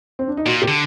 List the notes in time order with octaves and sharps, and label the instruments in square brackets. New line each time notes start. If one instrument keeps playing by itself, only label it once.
[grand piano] C4
D4
D#4
[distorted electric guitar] A#2 [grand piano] F#4
[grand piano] G4
[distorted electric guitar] D3